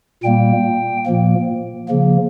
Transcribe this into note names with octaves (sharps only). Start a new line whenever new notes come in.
A#2 G3 A#3 G5
A#2 F3 A#3
C#3 F3 A#3